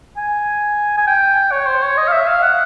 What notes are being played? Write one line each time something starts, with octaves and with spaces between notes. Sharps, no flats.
G#5
G#5
G5
C#5
C5
C#5
D#5
F5
E5
F5
F#5